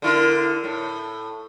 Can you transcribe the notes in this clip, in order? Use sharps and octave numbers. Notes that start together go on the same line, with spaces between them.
D3 E4 A#4
A2